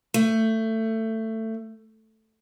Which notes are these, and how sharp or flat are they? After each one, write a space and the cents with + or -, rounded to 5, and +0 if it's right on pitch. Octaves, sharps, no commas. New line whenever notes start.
A3 +20